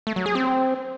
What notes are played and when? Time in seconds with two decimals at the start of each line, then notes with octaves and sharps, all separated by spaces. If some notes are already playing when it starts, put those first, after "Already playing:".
0.07 A3
0.16 F#3
0.26 G#4
0.35 C4